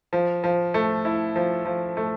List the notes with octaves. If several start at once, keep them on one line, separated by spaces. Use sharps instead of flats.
F3
F3
A3
E4
F3
F3
A3